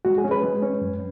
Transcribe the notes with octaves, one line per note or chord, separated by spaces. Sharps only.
G#3 F#4
G#4
C#4
B4
G#3
C#4
F#2